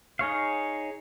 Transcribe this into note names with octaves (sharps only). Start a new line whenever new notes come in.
D#4 G#4 C#5 F5